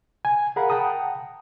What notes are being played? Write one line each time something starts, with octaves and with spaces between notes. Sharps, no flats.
G#5
G#4 A#4 F5 F#5 A#5 B5
F#5 G5 A5 A#5 D#6